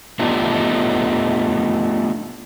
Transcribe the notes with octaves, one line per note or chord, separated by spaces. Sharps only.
A3 B3 D4 D#4 F4 G4